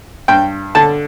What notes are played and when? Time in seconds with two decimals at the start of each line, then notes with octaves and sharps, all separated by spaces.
0.28 G2 G5
0.75 D3 A5